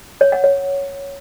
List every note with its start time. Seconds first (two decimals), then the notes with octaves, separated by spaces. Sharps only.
0.21 C#5
0.32 F#5
0.44 C#5